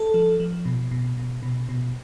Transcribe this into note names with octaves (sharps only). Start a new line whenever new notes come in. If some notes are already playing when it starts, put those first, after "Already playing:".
Already playing: A4
F3
F3
B2
B2
B2
B2
B2